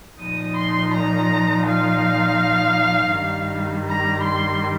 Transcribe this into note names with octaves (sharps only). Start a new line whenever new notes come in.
A#2 F3 D#4 D#6
C6
A#5
F5
G2 D#3 G3
A#5
C6